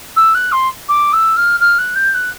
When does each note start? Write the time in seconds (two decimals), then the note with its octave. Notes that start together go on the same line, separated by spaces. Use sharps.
0.16 E6
0.34 F#6
0.52 C6
0.88 D6
1.13 E6
1.36 F6
1.60 F6
1.78 F#6
1.95 G6
2.14 F#6